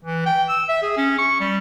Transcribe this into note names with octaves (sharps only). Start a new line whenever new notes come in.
E3
G5
E6
E5
G#4
C#4
C#6
G3